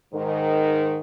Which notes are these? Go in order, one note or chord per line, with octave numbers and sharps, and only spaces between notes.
G#2 D#3